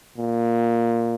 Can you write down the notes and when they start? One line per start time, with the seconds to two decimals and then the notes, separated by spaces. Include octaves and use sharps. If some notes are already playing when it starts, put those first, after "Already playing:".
0.18 A#2